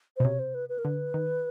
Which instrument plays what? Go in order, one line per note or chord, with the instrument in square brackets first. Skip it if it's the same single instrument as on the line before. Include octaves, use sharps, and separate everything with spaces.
[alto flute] C5
[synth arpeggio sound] B2
[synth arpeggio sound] C3 [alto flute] C#5
[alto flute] C5
B4
B4
A#4
[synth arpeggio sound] D3 [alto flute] B4
[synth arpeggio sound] D#3